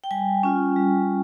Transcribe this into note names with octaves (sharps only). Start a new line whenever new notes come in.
G5
G3 G#5
C#4 F4
G3